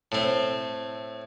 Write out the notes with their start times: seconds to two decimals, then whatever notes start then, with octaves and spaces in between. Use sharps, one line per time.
0.12 A2 C4